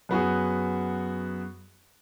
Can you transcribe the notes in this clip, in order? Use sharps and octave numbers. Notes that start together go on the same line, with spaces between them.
F#2 B3 F#4 G#4